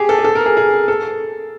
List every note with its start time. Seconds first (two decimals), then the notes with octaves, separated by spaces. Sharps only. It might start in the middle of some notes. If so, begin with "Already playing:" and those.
Already playing: G4 G#4
0.09 A4
0.18 G#4
0.24 A4
0.35 A#4
0.46 G#4
0.57 G#4
0.88 A4